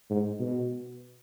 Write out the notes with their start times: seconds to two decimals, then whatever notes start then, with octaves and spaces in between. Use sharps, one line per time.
0.10 G#2
0.40 B2